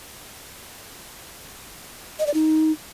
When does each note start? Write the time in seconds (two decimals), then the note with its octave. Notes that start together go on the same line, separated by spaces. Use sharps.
2.19 D#5
2.27 D5
2.34 D#4